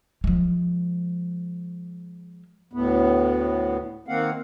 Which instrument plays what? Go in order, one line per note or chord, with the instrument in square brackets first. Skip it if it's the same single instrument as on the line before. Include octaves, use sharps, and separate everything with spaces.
[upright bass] F3 G#3
[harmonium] D2 A2 B3
D#3 A#3 C4 F5 F#5